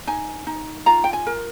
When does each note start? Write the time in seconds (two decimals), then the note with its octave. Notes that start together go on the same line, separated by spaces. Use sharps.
0.07 D#4 G#5
0.47 D#4
0.86 F4 A#5
1.04 G5
1.13 G#5
1.27 A#4